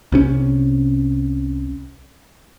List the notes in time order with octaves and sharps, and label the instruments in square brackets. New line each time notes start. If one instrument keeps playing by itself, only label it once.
[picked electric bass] C2 C3 C#4